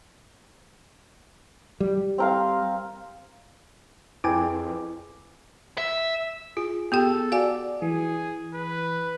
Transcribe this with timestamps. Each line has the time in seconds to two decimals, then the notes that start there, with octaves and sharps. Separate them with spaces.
1.80 G3
2.18 C4 A#4 F5
4.24 F2 E4 G#4 B4 G5 G#5 D6
5.78 E5
6.57 F4 G#4
6.92 B3 G4 A4 G5
7.32 F#4 D5 F5 G#5
7.82 E3 G#4
8.54 B4